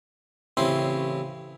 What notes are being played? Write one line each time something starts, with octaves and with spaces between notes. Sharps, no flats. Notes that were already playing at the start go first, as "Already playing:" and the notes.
A1 C#3 C4 E4 C6